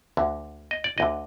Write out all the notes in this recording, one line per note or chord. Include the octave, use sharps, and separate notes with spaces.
D2 D3
D#5
D5
D2 D3 D#5